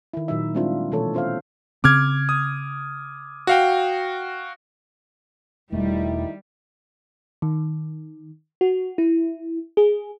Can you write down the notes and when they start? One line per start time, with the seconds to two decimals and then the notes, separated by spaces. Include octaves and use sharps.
0.14 D#3 E4
0.28 A#2 D#3 F#3 D#4 E5
0.54 G3 G#3 C4 D4 E4 F4
0.92 B2 E3 A3 A4 C#5
1.14 C#4 F4 C5 E5 F5
1.84 C#3 C4 D6 F6 G#6
2.29 D#6
3.47 F#4 F5 G5
5.72 E1 D2 D#3 G3 A3 E4
7.42 D#3
8.61 F#4
8.98 E4
9.77 G#4